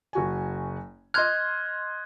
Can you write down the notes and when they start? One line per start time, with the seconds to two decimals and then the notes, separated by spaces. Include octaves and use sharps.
0.13 F#1 F#4 G#5
1.14 D#5 C6 F6 F#6 G#6